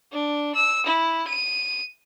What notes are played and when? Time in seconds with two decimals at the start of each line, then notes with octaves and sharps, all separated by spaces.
0.12 D4
0.55 E6
0.86 E4
1.28 D#7